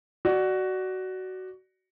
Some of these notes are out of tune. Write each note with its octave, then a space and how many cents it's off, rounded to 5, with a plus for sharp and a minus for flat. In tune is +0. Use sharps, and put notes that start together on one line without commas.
F#4 +15 D5 +15